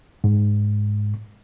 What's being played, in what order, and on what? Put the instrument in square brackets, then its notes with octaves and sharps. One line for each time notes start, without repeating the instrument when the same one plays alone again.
[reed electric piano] G#2